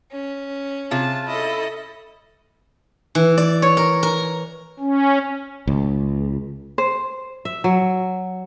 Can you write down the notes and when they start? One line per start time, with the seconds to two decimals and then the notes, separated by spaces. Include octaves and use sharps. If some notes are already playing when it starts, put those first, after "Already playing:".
0.12 C#4
0.91 C3 F4 G#4 A5
1.28 C#4 E4 A4 D#5
3.15 E3
3.38 D5
3.62 C#5
3.77 A#4
4.03 A#4
4.80 C#4
5.67 C#2
6.78 C5
7.45 E5
7.64 F#3